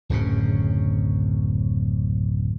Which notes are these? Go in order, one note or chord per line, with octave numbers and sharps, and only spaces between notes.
D1 F#2 C#3